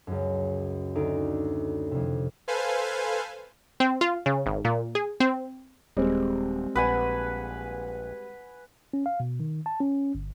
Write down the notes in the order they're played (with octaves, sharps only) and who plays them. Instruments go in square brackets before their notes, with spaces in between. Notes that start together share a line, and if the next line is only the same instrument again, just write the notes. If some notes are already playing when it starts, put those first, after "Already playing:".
[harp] C#2 F#2
D2 D#4 D7
F2 C3
[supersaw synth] A4 B4 C5 F5 G#5
[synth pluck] C4
F4
C#3
G#1
A#2
G#4
C4
[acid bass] D#1 [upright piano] G3 G#3 C4
[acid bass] A#1 [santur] B4 F#5 G#5
[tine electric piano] C#4
F5
B2
D#3
A5
C#4
G1